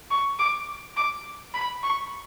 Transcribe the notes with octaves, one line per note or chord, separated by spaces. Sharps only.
C#6
D6
D6
B5
C#6